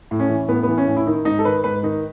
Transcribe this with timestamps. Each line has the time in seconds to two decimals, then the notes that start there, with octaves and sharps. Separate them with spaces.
0.11 A2
0.19 C#4
0.29 E3
0.48 A2 B3
0.63 E3 B3
0.78 C#4
0.88 A2
0.97 E4
1.06 D#3 D#4
1.25 G#2 D#4
1.39 A4
1.45 D#3 B4
1.64 G#2 B4
1.83 D#3 D#4